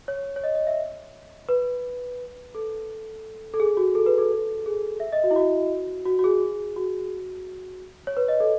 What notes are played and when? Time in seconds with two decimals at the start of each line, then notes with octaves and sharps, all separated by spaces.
0.08 C#5
0.36 C#5
0.44 D#5
0.55 D#5
0.67 E5
1.49 B4
2.55 A4
3.54 A4
3.60 G#4
3.77 F#4
3.95 A4
4.06 B4
4.18 A4
4.66 G#4
5.00 E5
5.12 D#5
5.24 F#4
5.31 E4
5.36 F#4
6.06 F#4
6.19 F#4
6.24 G#4
6.76 F#4
8.07 C#5
8.17 B4
8.28 D#5
8.40 A4